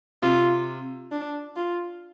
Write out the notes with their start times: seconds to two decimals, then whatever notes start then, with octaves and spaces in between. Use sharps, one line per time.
0.22 C3 F4
1.12 D4
1.56 F4